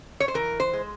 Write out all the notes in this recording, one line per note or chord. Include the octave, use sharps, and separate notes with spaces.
C#5
C5
E3 A#4
C5
G#3